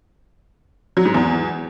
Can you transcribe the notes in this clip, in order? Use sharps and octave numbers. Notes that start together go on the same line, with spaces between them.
F#3
G#2
E2